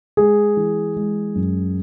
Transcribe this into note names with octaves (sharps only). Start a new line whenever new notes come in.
G#3 G#4
E3
G#3
F#2